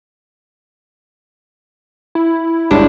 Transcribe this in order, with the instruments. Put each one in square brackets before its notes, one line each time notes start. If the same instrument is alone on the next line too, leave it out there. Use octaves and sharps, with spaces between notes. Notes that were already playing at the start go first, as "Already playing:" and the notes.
[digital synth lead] E4
[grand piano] G1 G#3 C#5 [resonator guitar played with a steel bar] G3 D4